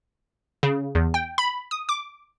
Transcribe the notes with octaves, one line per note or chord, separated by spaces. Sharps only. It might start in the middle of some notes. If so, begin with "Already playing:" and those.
C#3
E2
G5
B5
D#6
D6